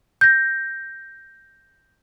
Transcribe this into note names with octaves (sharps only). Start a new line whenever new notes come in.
G6 A#6